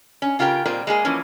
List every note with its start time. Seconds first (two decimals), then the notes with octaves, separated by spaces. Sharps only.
0.22 C#4
0.39 C#3 F4 G4 A#4 G5
0.66 A#2 G3 C4 F4 A#4
0.87 G#3 A#3 G#4
1.05 E3 F3 A#3 C#4